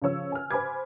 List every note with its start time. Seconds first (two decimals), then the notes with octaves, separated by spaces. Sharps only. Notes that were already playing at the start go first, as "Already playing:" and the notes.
0.02 C#3 F3 C#5 E6
0.32 G#5 F6
0.51 C5 G#5 B5 D6 G#6